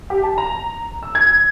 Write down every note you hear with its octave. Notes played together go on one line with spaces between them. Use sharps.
G4
A5
A#5
E6
G#6